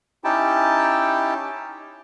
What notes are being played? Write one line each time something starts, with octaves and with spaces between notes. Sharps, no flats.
C#4 D#4 E4 G4 G5 A5